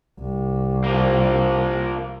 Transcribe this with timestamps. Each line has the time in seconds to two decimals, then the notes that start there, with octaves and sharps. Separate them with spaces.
0.20 C2
0.84 F3 A#3